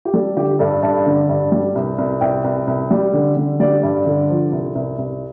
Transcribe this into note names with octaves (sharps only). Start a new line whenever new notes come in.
G4
G3 A4
D3 G4
G2 A4
G2 A5
D3
G2
G3
C2
C2
C2 G5
C2
C2
G3
D3
D3
G3 D5
G2
D3
F3
C2
C2
C2